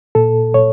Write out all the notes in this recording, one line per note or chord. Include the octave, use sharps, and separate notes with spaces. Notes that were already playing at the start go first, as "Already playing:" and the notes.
A#2 A4
A#2 C#5